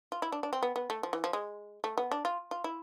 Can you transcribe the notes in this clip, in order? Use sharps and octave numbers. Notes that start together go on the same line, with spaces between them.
F4
E4
D4
D4
C4
B3
B3
A3
F3
E3
F3
G#3
A3
B3
D4
F4
F4
E4